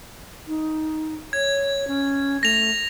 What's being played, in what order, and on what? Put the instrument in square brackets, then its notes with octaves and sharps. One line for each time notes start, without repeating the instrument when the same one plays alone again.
[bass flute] D#4
[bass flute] C#5 [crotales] G#6
[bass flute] C#4
[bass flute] A3 [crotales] A#6 F7